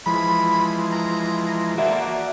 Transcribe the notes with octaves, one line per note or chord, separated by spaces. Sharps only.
E3 F3 G#3 B5
A#5
A#3 F#4 D5 E5